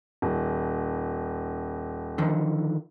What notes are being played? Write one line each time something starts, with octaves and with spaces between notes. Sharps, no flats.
D#1
D3 D#3 F3